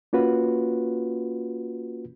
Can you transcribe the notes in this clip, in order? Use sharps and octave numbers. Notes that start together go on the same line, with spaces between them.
A#3 C#4 F4 F#4 B4